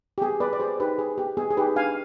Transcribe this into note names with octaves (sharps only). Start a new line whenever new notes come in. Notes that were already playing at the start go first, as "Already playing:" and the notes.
G4
B3 G#4
B3 B4 D5
D5
G4 G#4 C5
D#4 G4 B4
G4 G#4
B3 G4
B3 G#4
G#4
D#4 G4 B4
D4 F5 G#5